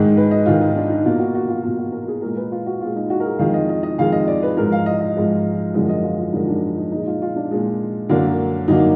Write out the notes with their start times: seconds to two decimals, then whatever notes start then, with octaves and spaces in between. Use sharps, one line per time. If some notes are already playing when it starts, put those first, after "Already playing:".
Already playing: G#2 D#3 G#3 D#4
0.17 B4
0.31 D#5
0.46 G#2 D#3 G#3 F4
0.61 D#4
0.76 D4
0.90 D#4
1.05 B2 A#3 F4
1.19 F#4
1.35 F#4
1.48 F4
1.63 B2 A#3 F4
1.79 F#4
1.92 A#4
2.08 G#4
2.22 A#2 G#3 A#4
2.36 B4
2.52 F4
2.66 F#4
2.81 A#2 G#3 F4
2.96 D#4
3.10 F#4
3.20 A#4
3.25 G#4
3.39 F2 D#3 G#3 F5
3.54 D#5
3.69 D#5
3.83 D#5
3.98 F2 D#3 G#3 F5
4.12 D#5
4.27 D5
4.43 B4
4.57 G#2 F3 G#3 A#4
4.72 F5
4.86 D#5
5.01 D#5
5.16 G#2 F3 G#3
5.74 F#2 D3 F3 G#3 D#5
5.89 D#5
6.03 F4
6.18 F4
6.33 F#2 D3 F3 G#3 D#4
6.48 D4
6.62 D4
6.77 D#4
6.91 A#2 G#3 D#4
7.07 F4
7.22 F4
7.36 D4
7.51 A#2 G#3
8.09 F#2 D3 F#3 A#3
8.68 F#2 D3 F#3 A#3 D#4